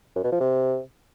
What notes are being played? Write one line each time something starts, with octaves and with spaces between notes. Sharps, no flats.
F#2
B2
F3
C3